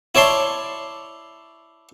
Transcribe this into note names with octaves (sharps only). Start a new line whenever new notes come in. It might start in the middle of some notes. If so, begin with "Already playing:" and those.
E4 C#5 D5 A5 C6